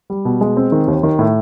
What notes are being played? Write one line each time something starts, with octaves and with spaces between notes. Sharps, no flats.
G3
B2
G#3
C4
D#3
D#2
D#3
A2